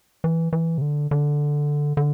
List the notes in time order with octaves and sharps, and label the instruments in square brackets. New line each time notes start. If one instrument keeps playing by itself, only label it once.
[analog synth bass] E3
E3
C3
D3
D3
D3